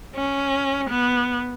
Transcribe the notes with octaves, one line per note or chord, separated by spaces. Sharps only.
C#4
B3